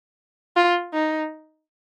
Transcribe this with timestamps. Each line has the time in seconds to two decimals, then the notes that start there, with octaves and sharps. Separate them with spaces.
0.56 F4
0.94 D#4